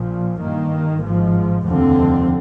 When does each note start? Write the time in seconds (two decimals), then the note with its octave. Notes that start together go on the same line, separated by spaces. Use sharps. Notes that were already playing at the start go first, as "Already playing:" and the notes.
Already playing: A#1 A#2 F3
0.39 G2 D#3 A#3
1.01 G#1 G#2 F3
1.65 F1 D#2 D3 F3 C4